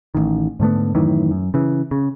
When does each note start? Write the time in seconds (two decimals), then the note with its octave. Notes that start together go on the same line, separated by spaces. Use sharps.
0.15 A1 D#3
0.60 G#2 D3 A3 B3
0.95 F#2 A2 D#3 E3
1.31 F#2
1.54 C#3 E3
1.91 C#3